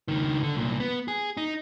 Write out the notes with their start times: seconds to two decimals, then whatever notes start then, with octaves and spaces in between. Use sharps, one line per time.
0.08 C#2 D#3
0.43 D3
0.55 C2 A#2
0.80 B3
1.08 G#4
1.37 D#4